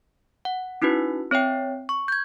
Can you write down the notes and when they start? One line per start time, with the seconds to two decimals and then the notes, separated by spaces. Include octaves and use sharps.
0.45 F#5
0.82 C#4 D#4 E4 F#4 B4
1.31 C4 C#5 E5 G5
1.89 C#6
2.08 G6 G#6